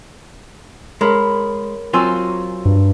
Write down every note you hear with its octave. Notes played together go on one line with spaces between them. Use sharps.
G#3 A#4 C#5 B5
F#3 C4 F4 G#5 C6 E6
G2